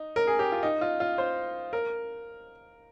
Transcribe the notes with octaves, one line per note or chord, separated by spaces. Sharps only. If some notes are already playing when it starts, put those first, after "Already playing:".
Already playing: D#4
A#4
G#4
G4
F4
D#4
F4
F4
C5
A#4